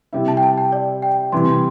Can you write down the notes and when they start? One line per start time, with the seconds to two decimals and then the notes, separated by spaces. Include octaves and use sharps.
0.13 C3 G3 E4
0.28 A5
0.37 G5
0.43 A5
0.58 G5
0.72 D5
1.02 G5
1.32 C3 E3 G3 C6